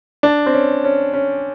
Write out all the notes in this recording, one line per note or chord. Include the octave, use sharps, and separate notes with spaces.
D4
C4
C#4
C#4
C#4